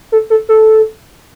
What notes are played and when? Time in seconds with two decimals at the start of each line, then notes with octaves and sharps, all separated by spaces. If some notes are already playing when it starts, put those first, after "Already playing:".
0.12 A4
0.30 A4
0.49 A4